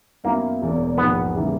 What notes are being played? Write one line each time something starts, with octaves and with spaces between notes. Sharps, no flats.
F#2 D#3 F#3 A#3 B3 E4
E1 E2 B2
A#1 G#2 D#3 B3
C#3 E3 G3 A#3